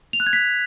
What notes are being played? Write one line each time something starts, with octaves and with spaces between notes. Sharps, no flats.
F7
F#6
G#6
B6